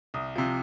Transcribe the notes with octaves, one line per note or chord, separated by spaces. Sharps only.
C2 D#6
C3 F3